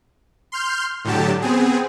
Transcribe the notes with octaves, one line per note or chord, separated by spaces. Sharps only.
C6 F6 G6
A2 D3 F#3 G4 A5
B3 C4 G#4